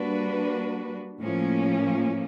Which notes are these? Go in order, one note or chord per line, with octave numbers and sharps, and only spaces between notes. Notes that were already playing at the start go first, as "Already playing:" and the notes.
Already playing: G3 A#3 D4 F#4 B4
A2 F3 A#3 C#4